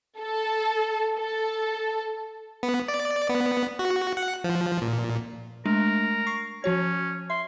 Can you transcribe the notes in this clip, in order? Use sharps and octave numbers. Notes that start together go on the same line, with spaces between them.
A4
A4
B3
D5
B3
F#4
F#5
F3
A#2
G#3 A3 D4 A#4
C#6 C7
F3 C#4 F#4 C#5
E5 C6